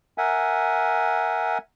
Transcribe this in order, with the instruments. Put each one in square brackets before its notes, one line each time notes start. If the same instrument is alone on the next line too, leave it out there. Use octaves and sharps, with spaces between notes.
[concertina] A#4 E5 F#5 G#5